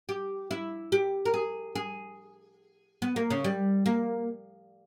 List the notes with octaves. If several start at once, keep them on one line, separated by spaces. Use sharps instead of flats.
G4
E4
G4
A#4
G#4
G#4
B3
A#3
C#3
G3
A#3